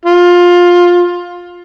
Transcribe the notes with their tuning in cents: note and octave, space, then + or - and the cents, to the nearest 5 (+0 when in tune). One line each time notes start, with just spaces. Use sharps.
F4 +15